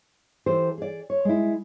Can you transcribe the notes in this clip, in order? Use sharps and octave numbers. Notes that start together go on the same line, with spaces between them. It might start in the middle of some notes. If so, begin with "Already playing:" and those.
E3 G4 A4 C5
G#4 D5
C#5
G#3 E4